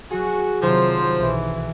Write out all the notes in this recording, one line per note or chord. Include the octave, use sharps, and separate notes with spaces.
F#3 F#4 G#4
C3 D#3 F3 F#3 C5
B1 E3